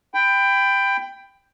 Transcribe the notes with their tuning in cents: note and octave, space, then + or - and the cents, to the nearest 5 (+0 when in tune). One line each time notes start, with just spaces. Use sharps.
G5 +10 B5 +25